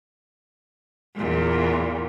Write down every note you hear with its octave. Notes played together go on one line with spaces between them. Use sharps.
E2 A#2